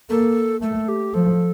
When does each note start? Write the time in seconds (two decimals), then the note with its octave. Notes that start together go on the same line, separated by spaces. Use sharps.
0.10 A#3 A4
0.62 A3 A4
0.88 G4
1.14 F3 A4